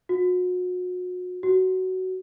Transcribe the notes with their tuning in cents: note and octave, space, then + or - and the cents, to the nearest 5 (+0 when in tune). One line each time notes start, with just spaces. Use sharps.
F#4 -35
F#4 +15